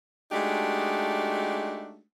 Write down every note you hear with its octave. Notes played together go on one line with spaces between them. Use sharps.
G#3 A3 D4 D#4 F#4 G4